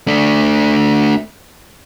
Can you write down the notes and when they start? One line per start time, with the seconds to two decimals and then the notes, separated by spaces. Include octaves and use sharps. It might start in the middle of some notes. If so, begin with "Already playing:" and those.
0.07 A3 D4